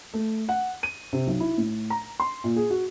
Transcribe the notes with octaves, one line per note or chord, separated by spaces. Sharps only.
A3
F#5
D#7
C3
B1
E4
A2
A#5
C6
A#2
G#4
F#4